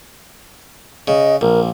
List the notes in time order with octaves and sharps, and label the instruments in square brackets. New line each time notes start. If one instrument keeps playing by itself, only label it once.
[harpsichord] C#3 [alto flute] D#5
[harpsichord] A#1 [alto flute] A#4